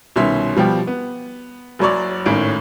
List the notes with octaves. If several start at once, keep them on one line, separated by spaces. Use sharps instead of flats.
C2 B2 D#3 C#4 E5 C6
B2 F3 G3 G4
B3
F#1 F#2 F#3 C#5 D5
G#1 A2 D#3 C#4 D7